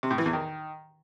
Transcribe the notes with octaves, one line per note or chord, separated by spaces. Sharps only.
C3
A2
E3
E2
D#3